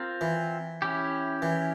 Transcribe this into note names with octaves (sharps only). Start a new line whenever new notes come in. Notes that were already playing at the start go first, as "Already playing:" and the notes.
Already playing: C4 F4 A#4
E3
C#4 E4 G4
E3